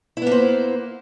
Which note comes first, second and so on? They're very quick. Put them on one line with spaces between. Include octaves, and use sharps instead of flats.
E4 B3 A#3 C5